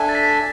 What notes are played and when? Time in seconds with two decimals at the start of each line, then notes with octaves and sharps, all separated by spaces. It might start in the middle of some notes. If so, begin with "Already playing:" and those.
Already playing: D4 A4 E5 G#5
0.09 A6
0.15 B6